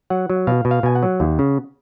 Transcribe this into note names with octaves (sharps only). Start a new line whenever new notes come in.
F#3 F#5
F#3
B2 F5
B2
F5
B2 G#5
F#5
F#3
D#2
C#3